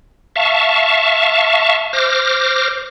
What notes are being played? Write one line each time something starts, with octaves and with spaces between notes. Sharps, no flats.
E5 F5 A5 C#6
C5 D6 F6 A#6